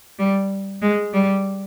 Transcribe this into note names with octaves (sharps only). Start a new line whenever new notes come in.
G3
G#3
G3